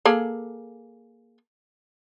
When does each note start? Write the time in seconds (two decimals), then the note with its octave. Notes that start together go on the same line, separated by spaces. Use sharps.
0.05 A#3 G#4 A4